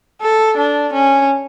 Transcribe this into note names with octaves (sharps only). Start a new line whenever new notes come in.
A4
D4
C#4